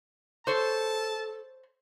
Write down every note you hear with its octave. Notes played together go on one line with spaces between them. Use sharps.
A4 C5 C#5 A5